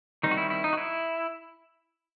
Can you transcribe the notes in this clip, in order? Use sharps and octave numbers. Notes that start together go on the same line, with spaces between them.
D#3 G3 C4 D#4
F#4
E4
E4
D#4
F#4
E4